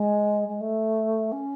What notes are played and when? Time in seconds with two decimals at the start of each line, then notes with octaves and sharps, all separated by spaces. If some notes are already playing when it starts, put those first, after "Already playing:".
Already playing: G#3
0.48 G#3
0.60 A3
1.32 C#4